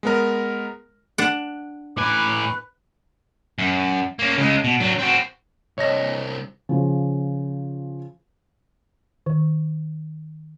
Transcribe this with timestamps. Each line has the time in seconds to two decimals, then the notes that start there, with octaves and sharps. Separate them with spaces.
0.03 G#3 B3 A#4
1.18 D4 F#5
1.97 A2 B4 G#5 D6
3.59 F#2
4.19 A#3 C#4
4.38 C#3 G#3
4.64 B2
4.80 F#3 D4
4.99 C4 F#4
5.78 C2 D4 C#5 D#5 A#6
6.69 C#3 F3
9.26 D#3